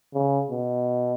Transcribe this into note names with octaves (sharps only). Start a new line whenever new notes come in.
C#3
B2